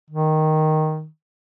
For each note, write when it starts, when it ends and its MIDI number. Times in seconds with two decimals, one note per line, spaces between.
0.10 1.07 51